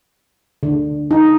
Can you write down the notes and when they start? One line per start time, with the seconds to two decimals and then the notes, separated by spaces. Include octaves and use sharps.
0.63 D3
1.11 D#4